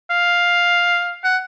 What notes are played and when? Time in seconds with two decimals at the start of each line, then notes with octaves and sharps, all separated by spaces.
0.10 F5
1.24 F#5